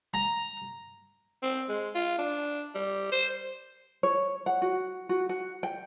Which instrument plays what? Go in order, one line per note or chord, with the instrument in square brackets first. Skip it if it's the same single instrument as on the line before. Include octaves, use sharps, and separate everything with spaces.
[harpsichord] A#5
[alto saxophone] C4
G#3
F4
D4
G3
C5
[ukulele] C#5
F#5
F#4
F#4
F#4
G5